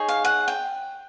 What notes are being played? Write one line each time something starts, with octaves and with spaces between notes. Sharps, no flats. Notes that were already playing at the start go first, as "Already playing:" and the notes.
Already playing: D#4 G#4 C#5
F5
F#5
G5